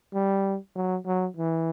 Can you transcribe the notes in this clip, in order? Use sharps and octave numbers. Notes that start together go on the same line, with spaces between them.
G3
F#3
F#3
E3